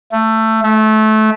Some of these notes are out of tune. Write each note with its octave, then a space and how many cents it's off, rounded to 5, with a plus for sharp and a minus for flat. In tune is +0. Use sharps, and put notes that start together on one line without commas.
A3 +15
A3 -20